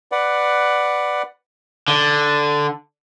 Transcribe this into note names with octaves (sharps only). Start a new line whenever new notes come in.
B4 D5 F#5
D3